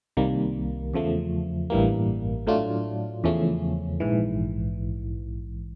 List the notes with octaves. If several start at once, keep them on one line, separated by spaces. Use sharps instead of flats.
C2 C3 D#3 G3 A#3
E2 C#3 F3 A3
A1 G2 E3 G3 A#3
A2 F#3 A3 D4 F4
E2 C#3 F3 A3 C#4
A#1 G#2 E3